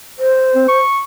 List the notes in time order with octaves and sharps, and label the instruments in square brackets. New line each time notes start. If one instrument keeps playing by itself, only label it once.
[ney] C5
[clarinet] C4
C#6